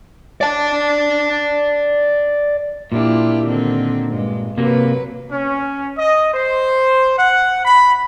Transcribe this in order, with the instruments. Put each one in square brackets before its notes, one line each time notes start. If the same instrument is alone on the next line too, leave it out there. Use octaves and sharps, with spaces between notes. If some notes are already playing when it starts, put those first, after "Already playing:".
[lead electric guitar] D5 A5
[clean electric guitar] A#2 D4 [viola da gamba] E4 F4 G4
[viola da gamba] D3 D#3 C4
G2 G#3
[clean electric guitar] C3 A#3 [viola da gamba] F#3 B4
[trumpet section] C#4
D#5
C5
F#5
B5